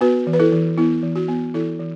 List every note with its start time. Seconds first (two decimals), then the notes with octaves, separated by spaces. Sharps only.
0.01 B3 F#4 B4
0.27 E3
0.33 B4
0.40 E4 A4
0.52 E3
0.78 B3 E4
1.03 E3
1.16 F#4
1.28 B3
1.54 E3 E4 A4
1.79 E3